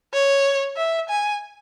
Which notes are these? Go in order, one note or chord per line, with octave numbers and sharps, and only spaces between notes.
C#5
E5
G#5